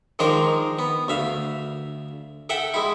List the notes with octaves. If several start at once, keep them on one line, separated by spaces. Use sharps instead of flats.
D#3 F3 G#3 D4 A#4 C5
B3
D2 E5 F5
A4 E5 F#5 G5
G#3 E4